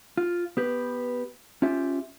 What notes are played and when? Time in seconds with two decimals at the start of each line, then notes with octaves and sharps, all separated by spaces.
0.17 F4
0.57 B3 G4 B4
1.62 C#4 F4 G4 E5